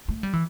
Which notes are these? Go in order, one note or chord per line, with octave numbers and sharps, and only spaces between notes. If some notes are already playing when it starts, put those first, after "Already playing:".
A3
G3
E3